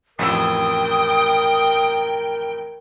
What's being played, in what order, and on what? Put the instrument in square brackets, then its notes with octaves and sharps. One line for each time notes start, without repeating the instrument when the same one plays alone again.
[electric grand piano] A1 F2 E6 [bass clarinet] A#4 [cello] G5 [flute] D#6